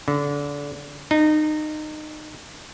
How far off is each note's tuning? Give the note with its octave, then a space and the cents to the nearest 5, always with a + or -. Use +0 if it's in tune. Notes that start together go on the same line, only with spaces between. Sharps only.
D3 -30
D#4 -25